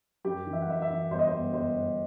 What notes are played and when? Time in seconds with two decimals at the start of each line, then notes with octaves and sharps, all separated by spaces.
0.24 F#2 G4
0.47 E3
0.53 E5
0.62 F#5
0.67 F#2 E5
0.82 E5
0.89 E3
1.10 G1 C5
1.19 D#5
1.27 C5
1.32 G1
1.53 G1 C5
1.75 G1